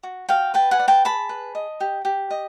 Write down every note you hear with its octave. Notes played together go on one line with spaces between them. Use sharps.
F#4
F#4 F5 G5
B4 G5 A5
F#5 G#5
D5
G5 A5
G#4 A5 B5
B4
D#5
G4
G4
D#5